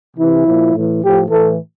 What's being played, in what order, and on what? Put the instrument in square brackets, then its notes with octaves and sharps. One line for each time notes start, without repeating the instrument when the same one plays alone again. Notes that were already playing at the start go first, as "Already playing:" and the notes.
[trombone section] C3 E3 E4
A#2 F3
A2 E3
A2 F3 G4
A2 E3 A4